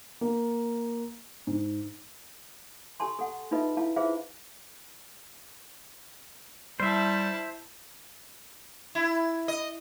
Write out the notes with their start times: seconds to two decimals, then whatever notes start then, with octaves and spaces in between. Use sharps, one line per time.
0.21 A#3
1.47 G#2
3.00 G4 A4 G#5 A5 C6
3.19 A4 F#5
3.51 D#4 F4 A4 B4 D#5 E5
3.77 E4 F5 A5
3.96 F4 G#4 B4 C5 E5 F5
6.80 G3 E4 C5 E5 A5
8.95 E4
9.48 D#5